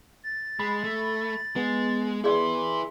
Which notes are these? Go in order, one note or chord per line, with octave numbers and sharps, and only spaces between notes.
A6
G#3 B5
A3
G#3 B3
E4 G#4 B4 D5 C6